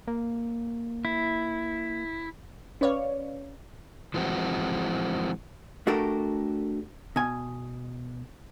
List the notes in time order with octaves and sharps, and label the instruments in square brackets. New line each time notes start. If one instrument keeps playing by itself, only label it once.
[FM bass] A#3
[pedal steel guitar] E4
[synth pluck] C#4 B4 C#5 D5 F5
[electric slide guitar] E3 F3 G#3 C4 F#4
[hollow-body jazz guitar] A3 D4 F#4 G4 A4 A#4
B2 G#5